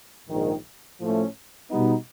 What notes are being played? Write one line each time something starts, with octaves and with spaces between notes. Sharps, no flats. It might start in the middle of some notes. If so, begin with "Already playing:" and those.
A#1 G#2 D#3
A2 F3 A3 C#4
B2 G3 B3 D#4